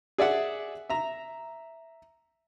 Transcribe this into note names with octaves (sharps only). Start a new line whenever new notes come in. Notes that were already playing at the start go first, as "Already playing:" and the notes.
G#4 D5 E5 F#5
E5 A#5